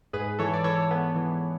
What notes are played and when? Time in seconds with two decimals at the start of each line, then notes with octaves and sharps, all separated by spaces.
0.13 G#2 G#4 B4
0.39 E3 A4 C#5
0.53 D5
0.64 E3 A4 C#5
0.91 B3
1.15 E3